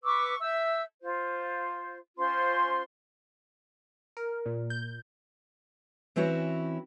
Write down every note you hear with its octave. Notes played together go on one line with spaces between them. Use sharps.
B4 C#6 D6 E6
E5 E6 G6
F4 C5
C#4 F4 C5 C6
A#4
A#2
G6
E3 C4 C#4 E4 F#4 C#5